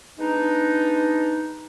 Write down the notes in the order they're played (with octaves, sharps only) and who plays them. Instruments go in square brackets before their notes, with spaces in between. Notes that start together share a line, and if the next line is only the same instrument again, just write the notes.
[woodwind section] G#3 B3 D4 D#4